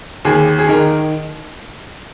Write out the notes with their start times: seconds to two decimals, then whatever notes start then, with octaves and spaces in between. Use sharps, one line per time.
0.25 D#2 G#4
0.59 G#4
0.68 D#3 A#4